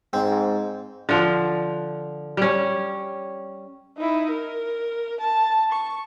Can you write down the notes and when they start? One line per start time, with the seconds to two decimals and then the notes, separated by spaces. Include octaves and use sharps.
0.13 G#2 C4
1.09 D3 F3
2.37 G3 C#4
3.97 D#4 E4
4.30 A#4
5.20 A5
5.72 C#6